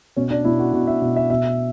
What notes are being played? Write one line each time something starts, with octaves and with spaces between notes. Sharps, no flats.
B2 C#4
D4
B2 E4
F#4
B2 F#4
E5
B2
E5
B2 E5